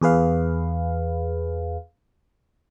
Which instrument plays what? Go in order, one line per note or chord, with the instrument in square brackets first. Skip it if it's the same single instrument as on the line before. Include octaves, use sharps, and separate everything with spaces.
[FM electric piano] E2 G#4 B4 F5